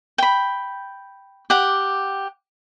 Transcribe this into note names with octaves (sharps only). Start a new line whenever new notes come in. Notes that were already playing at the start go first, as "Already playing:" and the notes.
G5 B5
G4 F#5 D6